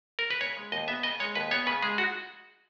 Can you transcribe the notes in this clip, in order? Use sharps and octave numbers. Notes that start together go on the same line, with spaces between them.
A#4
B4
C#3 C#5
G#3
D#2 D#5
B3 E5
C#3 D#5
G#3 C#5
D#2 B4
B3 C#5
C#3 B4
G#3 G#4
F#4